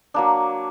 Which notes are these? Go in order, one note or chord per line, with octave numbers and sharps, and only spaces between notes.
F#3 A#3 D4